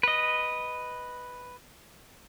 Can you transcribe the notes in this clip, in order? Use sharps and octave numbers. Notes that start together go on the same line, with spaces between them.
B4 D#5